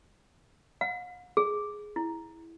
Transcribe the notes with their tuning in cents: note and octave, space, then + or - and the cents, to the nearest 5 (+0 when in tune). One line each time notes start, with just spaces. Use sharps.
F#5 -45
G#4 +5
E4 -5